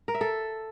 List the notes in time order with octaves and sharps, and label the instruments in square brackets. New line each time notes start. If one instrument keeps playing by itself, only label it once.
[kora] A#4
E5
A4